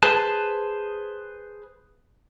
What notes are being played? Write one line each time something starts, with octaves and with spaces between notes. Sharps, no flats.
G#4 B4 C5 A5